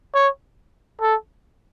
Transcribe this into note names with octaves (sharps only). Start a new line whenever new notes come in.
C#5
A4